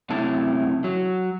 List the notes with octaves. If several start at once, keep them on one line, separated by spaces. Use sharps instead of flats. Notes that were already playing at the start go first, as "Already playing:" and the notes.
F#2 C3 A3 C#4 E4 A5
F#3